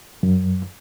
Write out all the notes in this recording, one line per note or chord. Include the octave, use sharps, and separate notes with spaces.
F#2